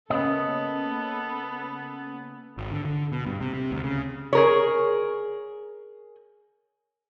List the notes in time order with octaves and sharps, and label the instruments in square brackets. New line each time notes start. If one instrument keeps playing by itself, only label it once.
[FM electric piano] C#3 A#3 C#4 [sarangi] B3 [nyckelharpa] A4 [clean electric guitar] D#5
[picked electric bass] G#1
D3
D3
B2
G2
C3
C3
D2
C#3
[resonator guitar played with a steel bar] G#4 A#4 C#5